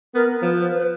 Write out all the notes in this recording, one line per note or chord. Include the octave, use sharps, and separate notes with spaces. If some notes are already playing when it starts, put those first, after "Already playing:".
B3 A#4
F3 B4